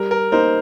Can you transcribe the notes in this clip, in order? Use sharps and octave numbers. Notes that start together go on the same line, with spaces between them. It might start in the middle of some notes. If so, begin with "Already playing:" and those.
Already playing: G3 A#4
A#4
A#3 D#4 A#4 C5